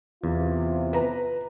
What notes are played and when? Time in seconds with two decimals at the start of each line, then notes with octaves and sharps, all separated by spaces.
0.24 E2 C3 F4
0.93 B4 A#5